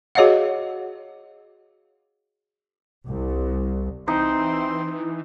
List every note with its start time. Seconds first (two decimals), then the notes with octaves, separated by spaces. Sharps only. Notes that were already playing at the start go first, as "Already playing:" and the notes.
0.15 F#4 G#4 C#5 D#5 F5 F#5
3.08 C2
4.08 E3 C4 D#4 C6